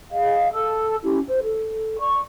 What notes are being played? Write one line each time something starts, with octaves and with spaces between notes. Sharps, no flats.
G#4 D#5 F5
A4 A5 E6
C#4 E4 G4
C5
A4
D5 C#6